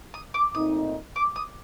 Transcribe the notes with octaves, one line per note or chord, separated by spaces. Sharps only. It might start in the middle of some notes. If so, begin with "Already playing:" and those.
D#6
D6
A#2 A3 C4 D#4 D#6
D6
D#6